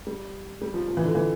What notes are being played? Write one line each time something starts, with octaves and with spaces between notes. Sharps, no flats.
G3
G3
F3
F3
E3
D3
E3